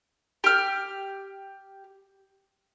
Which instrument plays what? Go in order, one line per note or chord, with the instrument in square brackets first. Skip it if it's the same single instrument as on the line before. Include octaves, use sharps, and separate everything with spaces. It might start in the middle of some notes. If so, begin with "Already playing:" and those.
[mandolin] G4 F6